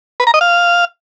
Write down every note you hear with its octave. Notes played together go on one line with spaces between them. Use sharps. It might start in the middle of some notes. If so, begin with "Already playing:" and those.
B4
A#5
D#5
F5